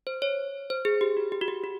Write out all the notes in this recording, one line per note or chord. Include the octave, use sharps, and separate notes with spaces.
C5
C#5
C5
G#4
G4
F#4
G4
F#4
G4
F#4